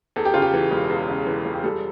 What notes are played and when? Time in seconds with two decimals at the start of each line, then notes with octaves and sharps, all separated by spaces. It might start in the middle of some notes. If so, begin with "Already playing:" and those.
0.16 E2 A4
0.25 G4
0.34 C#3 F4
0.42 G4
0.54 E3
0.71 E1
0.89 E2
1.08 C#3
1.27 E3
1.45 E1
1.54 G4
1.64 G3 A4